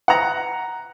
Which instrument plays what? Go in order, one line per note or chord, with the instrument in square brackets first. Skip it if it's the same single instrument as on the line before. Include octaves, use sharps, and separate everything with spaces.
[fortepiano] F#5 A#5